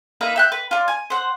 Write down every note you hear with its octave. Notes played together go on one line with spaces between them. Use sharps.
A#3 D#4 B4 E5
E5 G5 F#6
B4
F4 D5
G#5
C5 F#5